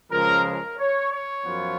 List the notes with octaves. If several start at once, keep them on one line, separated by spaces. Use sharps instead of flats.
C#2 C#3 F3 G#3 A#4
A#4
C#5
C#5
F#2 F3 B3 F4